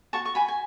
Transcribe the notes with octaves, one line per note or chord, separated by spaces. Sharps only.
F#4 A5 C#6
C#6
F#4 G#5 B5
G#5